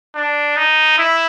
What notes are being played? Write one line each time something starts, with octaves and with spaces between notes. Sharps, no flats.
D4
D#4
E4